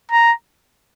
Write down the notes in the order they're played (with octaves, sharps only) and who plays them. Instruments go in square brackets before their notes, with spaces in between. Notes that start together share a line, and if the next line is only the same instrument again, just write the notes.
[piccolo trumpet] A#5